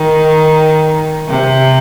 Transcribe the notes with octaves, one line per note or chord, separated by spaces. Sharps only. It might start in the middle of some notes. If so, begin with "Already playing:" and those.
Already playing: D#3
C3